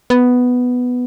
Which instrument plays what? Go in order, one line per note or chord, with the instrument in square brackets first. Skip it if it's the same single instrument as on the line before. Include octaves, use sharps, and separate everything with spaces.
[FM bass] B3